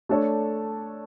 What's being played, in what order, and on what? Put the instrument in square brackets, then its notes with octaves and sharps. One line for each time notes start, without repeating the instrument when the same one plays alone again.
[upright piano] A3 D4 A4 C#5